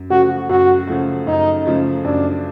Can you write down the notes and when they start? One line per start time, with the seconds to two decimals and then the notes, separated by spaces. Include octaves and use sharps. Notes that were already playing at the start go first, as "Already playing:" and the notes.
Already playing: F#2
0.10 C#3 F3 A3 F#4
0.49 F#2 F#4
0.87 C#3 F3 A3
1.27 F#2 D#4
1.66 C#3 F3 A3
2.04 F#2 D4